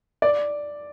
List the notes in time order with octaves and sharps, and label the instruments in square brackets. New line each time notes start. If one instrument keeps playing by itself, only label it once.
[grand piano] D5